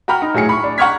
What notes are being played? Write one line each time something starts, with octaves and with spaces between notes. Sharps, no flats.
F#4 G5 A#5 B5 F6
D#4
A2 F#3 G#4 C#7
B5 C#6
D4
F#5 A#5 C#6 F6 G#6 B6